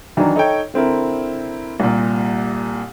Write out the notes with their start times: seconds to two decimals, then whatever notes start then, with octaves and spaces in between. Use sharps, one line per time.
0.17 D#3 E3 F#3 D4 D#4
0.36 D#4 A4 C#5 G5
0.74 D3 C4 E4 A#4
1.80 C2 A#2